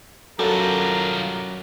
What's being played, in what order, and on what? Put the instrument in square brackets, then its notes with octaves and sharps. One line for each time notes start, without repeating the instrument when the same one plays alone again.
[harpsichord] F#2 [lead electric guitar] G3 F4 [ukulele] A4 [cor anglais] A#4